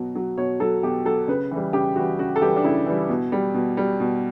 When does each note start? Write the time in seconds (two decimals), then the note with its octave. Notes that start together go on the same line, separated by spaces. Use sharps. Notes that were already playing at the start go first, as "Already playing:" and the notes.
Already playing: B2 F#3
0.15 F#3
0.38 B2 C#5
0.60 F#3 A4
0.83 B2 G4
1.06 F#3 A4
1.28 C#3 B4
1.51 E3 G3
1.73 C#3 G4
1.96 E3 G3 F#4
2.19 C#3 F#4
2.36 A4
2.42 E3 G3 G4
2.56 D4
2.64 C#3 E4
2.86 E3 G3
3.09 B2
3.32 G3
3.54 B2
3.77 G3
4.00 B2